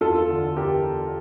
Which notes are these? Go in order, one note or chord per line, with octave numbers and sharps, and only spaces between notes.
E2 F4 A4
D3
E2 G4 A#4